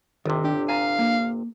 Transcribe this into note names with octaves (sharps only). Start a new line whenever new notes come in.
G1 C3 D#3
D4 G4
F5 G#5 A#5
A#3